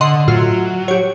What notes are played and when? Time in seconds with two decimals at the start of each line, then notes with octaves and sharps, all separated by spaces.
0.01 D3 D#5 F#5 C6
0.28 A2 F#3 F4
0.88 G4 C#5